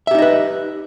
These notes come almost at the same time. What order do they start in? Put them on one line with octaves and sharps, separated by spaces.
E5 G4 D#4 D#5 B4